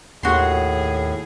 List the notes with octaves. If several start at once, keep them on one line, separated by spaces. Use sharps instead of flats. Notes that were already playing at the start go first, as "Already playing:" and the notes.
D#2 A2 F#4 G#4 C6